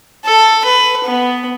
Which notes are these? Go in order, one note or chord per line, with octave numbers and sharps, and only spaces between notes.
A4
B4
B3